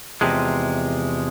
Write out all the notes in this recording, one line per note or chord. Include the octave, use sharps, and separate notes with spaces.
E2 C3 F3 G#3